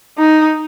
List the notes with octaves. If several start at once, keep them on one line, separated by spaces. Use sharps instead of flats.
D#4